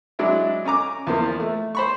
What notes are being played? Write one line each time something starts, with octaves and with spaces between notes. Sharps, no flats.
F#3 G#3 D4 E4
C#4 G#5 A#5 D6
E2 F3 A#3
A3
C5 B5 C#6